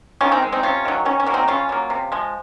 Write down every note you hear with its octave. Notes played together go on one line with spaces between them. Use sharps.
D#3 C#4 F4
C4 D#4
G#3
C4 D#4
C3 C#4 F4
D#3 F#3
D#3 C#4
C#4
F#3 A#3
C4 D#4
C#3 C#4 F4
F#3 A#3
C3
F3 G#3